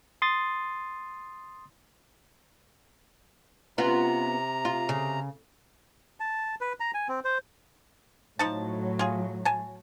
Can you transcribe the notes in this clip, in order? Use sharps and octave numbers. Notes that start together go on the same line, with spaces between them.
C6 D#6 A6
C3 B3 C#4 F4 A#5
F4
C#3
A5
B4
A#5
G#5
C4
C5
A2 F3 F#3 D#4 A5
F4 G#4
G#5 A5